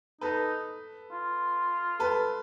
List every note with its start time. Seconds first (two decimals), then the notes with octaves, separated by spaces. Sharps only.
0.21 D#4 A4 B4
1.11 F4
1.99 A4 B4